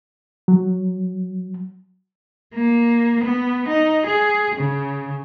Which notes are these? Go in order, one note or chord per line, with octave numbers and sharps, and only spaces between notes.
F#3
A#3
B3
D#4
G#4
C#3